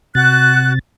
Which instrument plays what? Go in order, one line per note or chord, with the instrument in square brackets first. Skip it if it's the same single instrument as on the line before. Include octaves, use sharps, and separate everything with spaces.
[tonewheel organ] C3 A6 [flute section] F#4 F#6